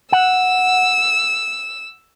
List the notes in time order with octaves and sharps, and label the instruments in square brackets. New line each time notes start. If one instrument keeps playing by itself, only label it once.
[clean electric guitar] F#5 [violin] E6